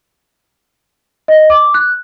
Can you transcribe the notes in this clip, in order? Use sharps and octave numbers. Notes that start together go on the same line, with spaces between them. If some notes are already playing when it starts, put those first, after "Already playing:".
D#5
D6
F#6